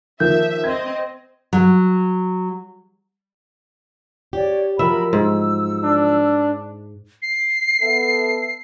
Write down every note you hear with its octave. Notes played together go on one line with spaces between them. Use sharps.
D#3 F3 A#3 E5 G6
C4 D#5 G#6
F#3
G4 C#5 D5
F3 F#3 A#4 E5 B5
G#2 E6
D4
C7
B3 A4 E5